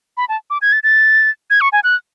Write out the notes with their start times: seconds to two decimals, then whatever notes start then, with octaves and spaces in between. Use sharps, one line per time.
0.17 B5
0.29 A5
0.50 D6
0.62 G#6
0.73 A6
0.83 A6
1.50 G#6
1.61 C#6
1.72 G#5
1.84 F#6